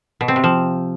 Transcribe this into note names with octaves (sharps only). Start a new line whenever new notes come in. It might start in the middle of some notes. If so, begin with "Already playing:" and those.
B2
C4
C3
F3